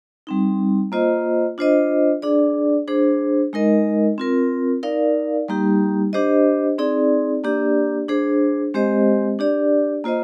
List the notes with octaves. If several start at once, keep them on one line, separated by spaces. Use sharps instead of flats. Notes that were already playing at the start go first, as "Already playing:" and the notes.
G3 C4 D#4
A#3 F4 C5 D#5
D4 F4 C5 D#5
D4 G#4 D5
D4 G#4 C5
G#3 D#4 A#4 D#5
C4 F4 A#4
D#4 A#4 D5 F5
G3 A#3 D#4 G4
D4 G4 C5 D#5
C4 D#4 G#4 D5
A#3 D4 G4 D5
D4 G#4 C5
G#3 C4 G4 C5 D#5
D4 G4 D5
A#3 F4 C5 D#5